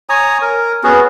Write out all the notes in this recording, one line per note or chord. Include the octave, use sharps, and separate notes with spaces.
C#5 G#5 A#5 D#6
A#4
B3 C#4 F#4 G#4